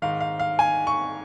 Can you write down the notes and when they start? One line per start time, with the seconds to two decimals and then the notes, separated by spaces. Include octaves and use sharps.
0.02 G#2 D#3 F5
0.20 F5
0.40 F5
0.59 G#5
0.87 C#6